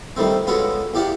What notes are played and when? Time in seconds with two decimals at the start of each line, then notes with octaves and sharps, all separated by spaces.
0.17 D#3 G3 A3 C4
0.47 G#3 B3 C#4 F4 F#4 A4
0.94 E2 G4 D5 F5 F#5